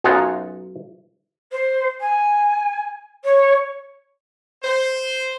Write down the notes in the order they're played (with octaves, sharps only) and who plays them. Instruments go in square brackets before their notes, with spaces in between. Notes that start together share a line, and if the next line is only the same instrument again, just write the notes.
[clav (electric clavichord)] B1 F#2 D#4 F4 F#5 G#5
[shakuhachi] C5
G#5
C#5
[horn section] C5